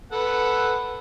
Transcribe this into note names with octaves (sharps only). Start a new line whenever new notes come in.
A4 B4 F#5